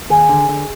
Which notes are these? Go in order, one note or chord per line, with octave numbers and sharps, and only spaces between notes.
D#2 G#4
D3
D3